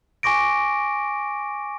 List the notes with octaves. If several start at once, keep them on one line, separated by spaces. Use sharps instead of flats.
G#5 C#6 D6 A#6 D7